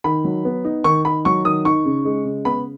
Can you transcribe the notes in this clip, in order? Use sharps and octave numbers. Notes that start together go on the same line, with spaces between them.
D#3 B5
F#3
B3
D#4
D#3 C#6
D#3 B5
F#3 C#6
D#3 D#6
D#4 C#6
C#3
G#3
C#3
B3 B5